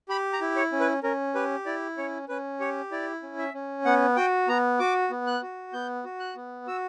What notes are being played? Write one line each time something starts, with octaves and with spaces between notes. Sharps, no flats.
G4 B5
A#5
E4
C#5
C#4
B4
C#4 A#4
G4 B4
E4 D5
C#4 C#5
C#4 B4
G4 C#5
E4 D5
C#4
E5
C#4
B3 F#5
F#4 G5
B3 A#5
F#4 D6
B3
F#6
F#4
B3 G6
F#4
F#6
B3
F#4 E6